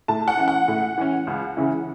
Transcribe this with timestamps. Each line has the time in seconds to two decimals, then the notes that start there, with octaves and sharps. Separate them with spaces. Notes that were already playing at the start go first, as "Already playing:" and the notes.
0.08 A2 A5
0.28 F#5
0.37 E3 C#4
0.48 F#5
0.68 A2
0.98 E3 C#4
1.27 C#2
1.57 C#3 E3 C#4 E4